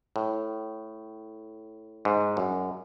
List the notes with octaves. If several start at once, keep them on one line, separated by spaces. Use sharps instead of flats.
A2
G#2
F#2